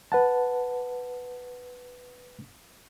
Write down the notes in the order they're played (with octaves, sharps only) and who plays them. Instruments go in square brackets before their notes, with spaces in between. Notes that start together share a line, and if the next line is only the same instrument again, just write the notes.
[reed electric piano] B4 F#5 A5